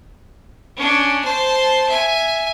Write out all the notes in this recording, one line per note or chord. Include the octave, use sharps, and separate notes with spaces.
C#4 D4
C5 A5
E5 G#5